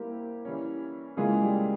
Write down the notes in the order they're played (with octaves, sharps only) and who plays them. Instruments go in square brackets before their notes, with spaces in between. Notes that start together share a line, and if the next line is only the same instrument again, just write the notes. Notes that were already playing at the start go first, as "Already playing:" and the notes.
Already playing: [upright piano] G3 C4 E4 G4 [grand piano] A#3
[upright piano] E3 G3 C#4
[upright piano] C#3 E3 A#3 F4 G#4 [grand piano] G#3
[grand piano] G3